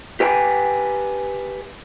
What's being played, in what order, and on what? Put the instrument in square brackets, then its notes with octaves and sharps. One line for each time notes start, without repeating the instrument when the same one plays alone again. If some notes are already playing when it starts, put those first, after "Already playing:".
[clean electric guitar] G4 B4 G5 G#5